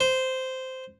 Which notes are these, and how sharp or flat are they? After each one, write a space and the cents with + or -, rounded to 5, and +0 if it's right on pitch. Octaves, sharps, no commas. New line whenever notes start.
C5 -10